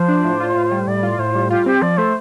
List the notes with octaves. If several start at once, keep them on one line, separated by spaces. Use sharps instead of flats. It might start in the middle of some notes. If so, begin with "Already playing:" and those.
Already playing: F3 C5
D4
A2
F4
A2
G3
A2 D5
F4
A2 C5
G3
F4 G4
C4 G4
F3 D5
A3 C5